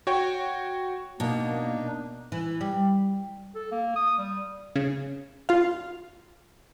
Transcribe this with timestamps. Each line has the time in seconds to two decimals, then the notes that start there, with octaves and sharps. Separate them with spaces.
0.07 F#4 C#5 G5
1.20 B2 A#3 D4 D#4
2.32 E3
2.61 G3
3.55 A4
3.72 A#3
3.96 D#6
4.19 G3
4.76 C#3
5.49 F4 F5